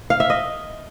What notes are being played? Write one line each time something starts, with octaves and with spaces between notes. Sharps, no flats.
F5
E5
D#5